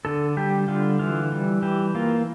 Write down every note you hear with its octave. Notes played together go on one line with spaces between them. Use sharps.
D3 A4
G3 G4
D3 F4
E3 F4
G3
E3 G4
A#3 F4